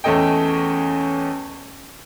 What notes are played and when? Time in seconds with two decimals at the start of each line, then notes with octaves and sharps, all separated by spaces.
0.04 E2 A3 C#4 A4 D#5 G5